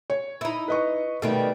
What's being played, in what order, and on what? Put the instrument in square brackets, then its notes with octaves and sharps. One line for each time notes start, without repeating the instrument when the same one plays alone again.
[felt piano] C#5
[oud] D#4 E4
[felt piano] B4 D#5 C#6
[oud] B2 D#3 G3 [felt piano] A3